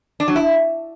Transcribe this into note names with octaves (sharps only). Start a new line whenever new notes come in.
D4
F#3
E4